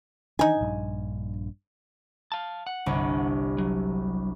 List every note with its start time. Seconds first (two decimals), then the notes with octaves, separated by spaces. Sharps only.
0.39 D#3 E3 D4 D#4 G#5
0.60 A#1 G2
2.32 F5 A5
2.67 F#5
2.86 G1 C2
3.58 F#3